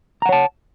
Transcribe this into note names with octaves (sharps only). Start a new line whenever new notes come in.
C#5 F#5 A5 A#5